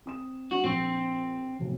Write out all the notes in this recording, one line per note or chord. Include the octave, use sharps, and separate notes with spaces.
C4 D#6 E7
F#3 D4 F#4
A#1 C4
F1 B1